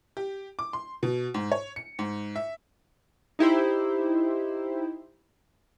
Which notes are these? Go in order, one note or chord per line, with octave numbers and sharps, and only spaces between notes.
G4
D6
C6
B2
G#2
C#5
C#7
G#2
E5
D#4 E4 G4 C5